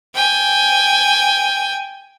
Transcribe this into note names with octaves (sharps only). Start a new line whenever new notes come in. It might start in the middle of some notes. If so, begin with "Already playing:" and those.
G5 G#5